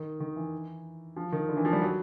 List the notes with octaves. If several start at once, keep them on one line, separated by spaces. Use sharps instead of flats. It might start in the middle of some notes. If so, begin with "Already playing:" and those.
Already playing: D#3
D#3
E3
F3
D#3
D3
E3
F3
G3
F#3